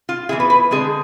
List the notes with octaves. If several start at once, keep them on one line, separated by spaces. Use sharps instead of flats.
F4
E3 B3 E4 G#4
B4
B4
D3 G#3 C4 G#4